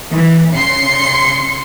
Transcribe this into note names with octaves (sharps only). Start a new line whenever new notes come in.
E3
C#3 C6 C7 C#7